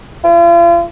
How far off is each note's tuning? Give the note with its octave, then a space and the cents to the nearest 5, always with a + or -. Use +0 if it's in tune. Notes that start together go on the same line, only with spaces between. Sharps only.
F4 -40